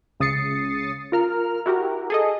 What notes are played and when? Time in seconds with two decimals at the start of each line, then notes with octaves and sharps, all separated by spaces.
0.20 C#2 C#3 D#6 A6 C7 C#7
1.12 F4 A#4 F6
1.66 E4 F#4 G4 A#4
2.10 G#4 A4 D#5